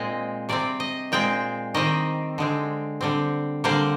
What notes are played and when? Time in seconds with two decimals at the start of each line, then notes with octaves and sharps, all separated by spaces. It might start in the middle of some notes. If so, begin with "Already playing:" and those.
Already playing: A#2 G#3 C4 D#5
0.49 C3 G3 C4 D5
0.80 D#5
1.12 A#2 G#3 C4 G5
1.74 D#3 G3 C4 D#5
2.38 D3 G#3 C4
3.01 D3 G3 C4
3.64 D3 G3 A#3 C5